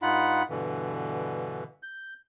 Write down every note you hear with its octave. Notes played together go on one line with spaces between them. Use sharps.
G2 D#4 F4 F#5 B5
G2 B2 D3 E3
G6